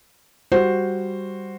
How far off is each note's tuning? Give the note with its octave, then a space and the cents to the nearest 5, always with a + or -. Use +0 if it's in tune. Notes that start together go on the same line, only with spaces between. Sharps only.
G3 +0 F#4 -5 C5 +0